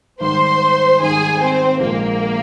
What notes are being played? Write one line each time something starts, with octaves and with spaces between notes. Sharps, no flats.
G#1 G#2 D#3 G3 C5 C6
G#1 G#2 D#3 G3 G#4 G#5
C4 C5
A#1 A#2 G#3 A#3 A#4